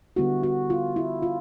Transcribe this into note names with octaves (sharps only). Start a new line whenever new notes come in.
D3 G3 B3 E4 F#4
F#4
F4
E4
F4